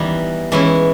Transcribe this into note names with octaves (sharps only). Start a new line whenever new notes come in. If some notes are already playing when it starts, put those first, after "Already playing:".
Already playing: E3 G3 B3 D#4
E3 G#3 C#4 E4